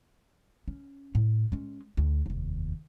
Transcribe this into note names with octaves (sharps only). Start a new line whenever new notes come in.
C#4
A2
G#3 C#4
D2
F1 D#2